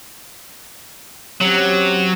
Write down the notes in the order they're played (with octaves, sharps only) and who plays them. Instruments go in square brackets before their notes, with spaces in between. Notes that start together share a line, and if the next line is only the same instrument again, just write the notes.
[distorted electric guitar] F#3 [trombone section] C4 C#4 G4